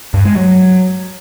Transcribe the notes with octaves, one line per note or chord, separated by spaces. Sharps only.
G2
G#3
F#3